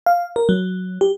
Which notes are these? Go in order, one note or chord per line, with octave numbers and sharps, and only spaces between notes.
F5
A#4
F#3
G4